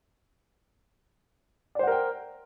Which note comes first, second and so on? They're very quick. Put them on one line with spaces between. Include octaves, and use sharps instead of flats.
D5 C5 F#5 A#4 G5